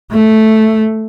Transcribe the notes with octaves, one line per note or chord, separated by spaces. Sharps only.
A3